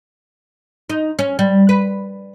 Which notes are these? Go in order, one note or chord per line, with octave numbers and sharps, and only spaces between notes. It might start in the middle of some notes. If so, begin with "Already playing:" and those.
D#4
C#4
G3
B4